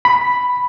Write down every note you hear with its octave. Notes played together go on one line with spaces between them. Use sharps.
B5